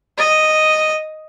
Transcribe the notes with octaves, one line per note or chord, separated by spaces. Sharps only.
D#5